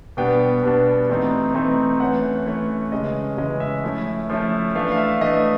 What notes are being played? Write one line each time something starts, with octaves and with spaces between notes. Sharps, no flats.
B2 G3 B3 D4 G5
B2 G3 B3 D4
E3 A3 C4 D#4
E3 A3 C4 D#4
E3 A3 C#4 F#5
E3 A3 C#4
C#3 E3 G#3 C#4 D#5
C#3 E3 G#3 C#4 D#5
E5
F3 A3 C#4 E4
F3 A3 C#4 E4
E3 A3 D4 F5
F5
E5
E3 A3 D4 D#5